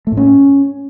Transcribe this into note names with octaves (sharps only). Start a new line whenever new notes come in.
A3
A2
C#4